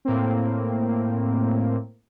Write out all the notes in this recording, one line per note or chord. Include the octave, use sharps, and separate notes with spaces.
A2 A#3 C4